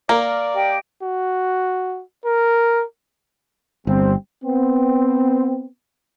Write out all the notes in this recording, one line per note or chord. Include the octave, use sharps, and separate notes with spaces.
A#3 A#4 D5
G4 D#5 G5
F#4
A#4
G1 G3 C4
B3 C4